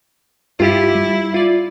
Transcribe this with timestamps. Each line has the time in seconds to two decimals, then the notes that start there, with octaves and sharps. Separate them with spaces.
0.60 G2 E4 F4 G4
0.95 G3
1.34 F4 D5